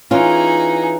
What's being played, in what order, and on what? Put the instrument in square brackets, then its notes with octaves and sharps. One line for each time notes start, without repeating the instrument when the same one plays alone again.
[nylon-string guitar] E3 C#4 F4 [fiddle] D#4 G#4